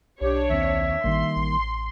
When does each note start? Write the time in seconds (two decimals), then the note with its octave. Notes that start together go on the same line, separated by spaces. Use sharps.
0.21 B1 D4 G4 C#5
0.50 D#2 C4 E5
1.04 A1 D#3 G3 A#3 C6
1.36 A1